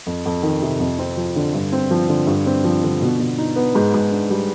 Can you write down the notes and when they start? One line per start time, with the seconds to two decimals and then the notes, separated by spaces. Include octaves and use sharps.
0.07 F2
0.26 F2
0.43 D#3
0.62 C3
0.80 F2
0.99 C4
1.17 F3
1.36 D3
1.54 G2
1.72 C4
1.91 F3
2.09 D3
2.27 G2
2.46 C4
2.64 F3
2.83 D3
3.02 B2
3.20 B2
3.38 D#4
3.56 B3
3.75 G#2
3.94 G#2
4.11 D4
4.30 G3